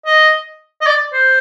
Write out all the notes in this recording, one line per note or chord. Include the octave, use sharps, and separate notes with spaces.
D#5
D#5
D5
C5